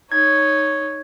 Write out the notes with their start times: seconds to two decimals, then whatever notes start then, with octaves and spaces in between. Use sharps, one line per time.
0.12 D#4 C#5 G#6